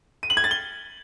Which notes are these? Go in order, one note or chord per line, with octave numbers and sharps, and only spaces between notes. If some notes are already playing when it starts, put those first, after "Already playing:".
D#7
F#7
G#6
A6
G7